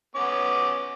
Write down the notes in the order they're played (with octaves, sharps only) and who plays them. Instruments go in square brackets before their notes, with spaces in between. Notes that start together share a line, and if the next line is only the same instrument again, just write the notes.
[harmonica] B3 C#4 D6